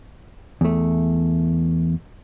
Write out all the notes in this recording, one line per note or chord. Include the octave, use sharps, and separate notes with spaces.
E2 A3